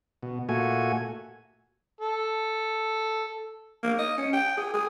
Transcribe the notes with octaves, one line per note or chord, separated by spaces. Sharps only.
B2
A#2 A3 F#4 G#5
A4
A#3
D#5
C#4
G5
G#4
G#4